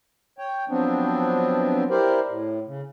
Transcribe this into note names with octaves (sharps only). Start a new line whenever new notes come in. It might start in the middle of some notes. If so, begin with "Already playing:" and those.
C#5 G5
F3 F#3 B3 C4 D4
E4 G4 A#4 C5 D5
A2
C#3